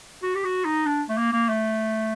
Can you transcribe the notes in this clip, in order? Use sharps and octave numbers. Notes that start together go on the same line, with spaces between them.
F#4
G4
F#4
D#4
D4
A3
A#3
A#3
A3